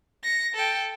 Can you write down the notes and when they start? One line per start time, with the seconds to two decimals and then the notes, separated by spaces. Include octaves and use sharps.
0.23 A#6 C#7
0.55 A4 G5